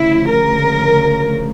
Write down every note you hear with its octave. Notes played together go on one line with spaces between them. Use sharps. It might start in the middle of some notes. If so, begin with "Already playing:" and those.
Already playing: D2 C#3 F3 E4
A#4